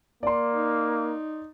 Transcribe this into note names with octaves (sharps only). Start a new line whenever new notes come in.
A#3 D5 C6
D#4